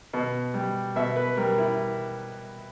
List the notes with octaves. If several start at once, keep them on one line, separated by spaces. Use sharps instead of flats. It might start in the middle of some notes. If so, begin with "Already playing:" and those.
B2
G3
B2 E5
B4
G3 A#4
E4